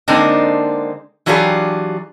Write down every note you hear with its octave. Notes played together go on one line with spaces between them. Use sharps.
D3 G#3 A#3 C4 D4 D#4
E3 F#3 D4 F4 G4 G#4